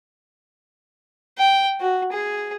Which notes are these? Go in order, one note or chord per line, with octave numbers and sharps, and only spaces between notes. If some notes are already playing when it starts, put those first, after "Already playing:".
G5
F#4
G#4